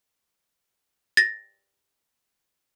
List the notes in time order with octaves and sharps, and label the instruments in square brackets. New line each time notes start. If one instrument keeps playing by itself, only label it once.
[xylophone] A6 A#6